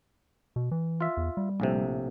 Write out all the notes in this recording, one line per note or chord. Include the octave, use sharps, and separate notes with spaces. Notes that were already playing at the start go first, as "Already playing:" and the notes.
B2
E3
F4 E5
E2
G3
A#1 A2 C3